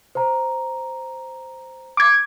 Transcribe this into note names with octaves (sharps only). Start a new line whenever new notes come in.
C5 A#5
D6 G#6